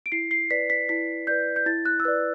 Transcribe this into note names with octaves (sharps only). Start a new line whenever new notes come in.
D7
E4 C7
C7
B4 D5 B6
B6
E4 B6
B4 D5 G6
G6
E4 A6
F#6
E6
B4 D5 F#6